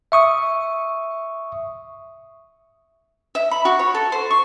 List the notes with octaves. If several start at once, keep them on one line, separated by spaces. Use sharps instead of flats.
E5 C#6 D#6
E5
B5
F#4
C#5
A4
C5
C#6